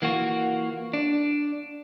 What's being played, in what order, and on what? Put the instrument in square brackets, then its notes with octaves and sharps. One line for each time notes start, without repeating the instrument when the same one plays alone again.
[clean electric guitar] E3 A#3 F4 F#4
D4